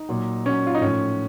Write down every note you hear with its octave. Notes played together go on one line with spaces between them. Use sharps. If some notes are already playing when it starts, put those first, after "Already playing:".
Already playing: D#4
A#2 F#3
A#2 F#3 C#4
F4
D#4
A2 F3 C#4